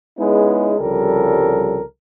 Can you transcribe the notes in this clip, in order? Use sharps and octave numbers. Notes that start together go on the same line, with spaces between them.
G#3 B3 C#4 D#4 E4 G#4
C2 C#3 F3 G3 A4 A#4